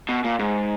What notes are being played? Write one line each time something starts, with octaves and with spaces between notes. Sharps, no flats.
B2
A#2
G#2